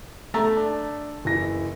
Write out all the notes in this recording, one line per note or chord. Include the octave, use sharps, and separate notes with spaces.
A3 A#5
D4
F#1 E3 A#6